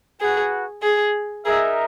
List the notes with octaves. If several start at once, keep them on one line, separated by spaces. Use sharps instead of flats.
F#4 G#4 B4 F#5
G#4
D#4 G#4 A#4 E5